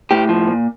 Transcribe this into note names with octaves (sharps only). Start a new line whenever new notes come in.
A2 G4
F3
A#2